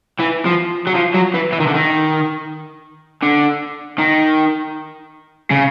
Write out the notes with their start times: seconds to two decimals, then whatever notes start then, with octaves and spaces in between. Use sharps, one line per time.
0.20 E3
0.46 F3
0.87 F#3
0.95 F3
1.15 F#3
1.34 E3
1.53 E3
1.60 D#3
1.67 D3
1.74 D#3
3.23 D3
3.98 D#3
5.51 C#3